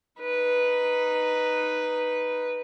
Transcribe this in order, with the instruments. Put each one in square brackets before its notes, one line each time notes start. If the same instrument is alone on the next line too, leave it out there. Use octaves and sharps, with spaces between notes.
[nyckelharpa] D#4 B4